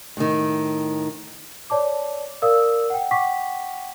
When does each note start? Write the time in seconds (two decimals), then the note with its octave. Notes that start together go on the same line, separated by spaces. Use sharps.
0.17 A2 D#3
1.70 C#5 D5 A5 D6
2.42 A#4 D5 F5 D#6 E6
2.90 F#5 G5
3.11 F#5 G5 C#6 D6 B6